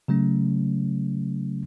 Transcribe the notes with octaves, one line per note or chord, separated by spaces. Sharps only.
C#3 F#3 A3 C#4